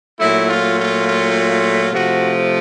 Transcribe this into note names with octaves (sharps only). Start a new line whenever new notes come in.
A#2 F#3 A3 E4
F4
F4
F4
F4
C3 F3 A3 F#4